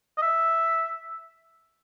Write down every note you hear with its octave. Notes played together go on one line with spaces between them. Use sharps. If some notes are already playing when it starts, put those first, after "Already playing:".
D#5
E5